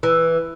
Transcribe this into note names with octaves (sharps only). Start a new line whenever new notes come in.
E3